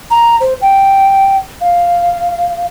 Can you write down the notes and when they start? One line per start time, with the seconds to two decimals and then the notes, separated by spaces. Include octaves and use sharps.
0.11 A#5
0.40 C5
0.62 G5
1.61 F5